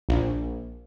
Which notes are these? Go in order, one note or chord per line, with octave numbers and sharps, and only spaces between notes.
A#1